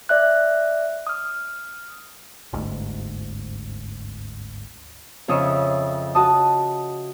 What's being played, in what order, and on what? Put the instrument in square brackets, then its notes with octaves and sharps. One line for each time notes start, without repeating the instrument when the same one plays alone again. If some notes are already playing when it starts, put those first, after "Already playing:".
[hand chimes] D5 E5 F#6
D#6 F6
[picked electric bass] G1 D2 G#2
[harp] F2 C#3 D#5 E5 C#6
F#4 D#5 A5 D#6